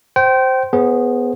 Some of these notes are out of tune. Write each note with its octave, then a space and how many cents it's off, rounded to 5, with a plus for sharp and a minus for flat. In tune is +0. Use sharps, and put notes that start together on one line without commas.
C5 +0 G5 -25
B3 +0 G#4 +5 C5 +40